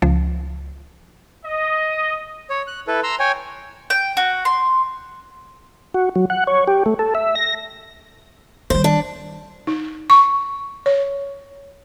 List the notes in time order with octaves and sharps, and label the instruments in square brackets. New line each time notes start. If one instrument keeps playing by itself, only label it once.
[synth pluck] C#2 F3
[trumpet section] D#5
[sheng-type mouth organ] C#5
F#6
E4 A4 B4
A#5 C6 E6
C#5 G5 G#5
[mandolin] G5
F#4
C6
[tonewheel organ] F#4
F#3
F#5
C#5
G4
A3
A4
E5
A#6
[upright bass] D#3 G3 [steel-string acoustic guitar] C5
[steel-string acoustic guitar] D4
[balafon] D#4
C#6
C#5